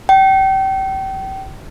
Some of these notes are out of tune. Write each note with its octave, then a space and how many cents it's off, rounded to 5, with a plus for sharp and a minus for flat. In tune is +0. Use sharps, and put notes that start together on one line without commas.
G5 -30